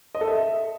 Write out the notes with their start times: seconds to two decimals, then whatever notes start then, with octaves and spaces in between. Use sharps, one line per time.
0.15 D#5
0.21 A4
0.27 E5